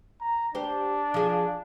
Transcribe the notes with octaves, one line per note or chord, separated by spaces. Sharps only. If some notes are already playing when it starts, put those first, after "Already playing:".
A#5
D4 G4 C5
F3 G#4